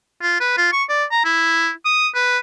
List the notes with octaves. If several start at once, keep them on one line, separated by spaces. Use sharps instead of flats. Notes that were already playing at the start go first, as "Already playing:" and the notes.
F4
B4
F4
C#6
D5
A#5
E4
D#6
B4